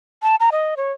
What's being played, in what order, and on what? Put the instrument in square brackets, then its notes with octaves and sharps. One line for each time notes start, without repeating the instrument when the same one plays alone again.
[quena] A5
A#5
D#5
C#5